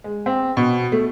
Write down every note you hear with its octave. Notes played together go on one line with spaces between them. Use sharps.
G#3
C4
B2
A3